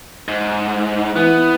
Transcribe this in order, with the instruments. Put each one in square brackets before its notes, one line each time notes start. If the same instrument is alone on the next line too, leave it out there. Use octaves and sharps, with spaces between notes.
[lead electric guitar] G#2
[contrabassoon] E3 [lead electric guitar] B3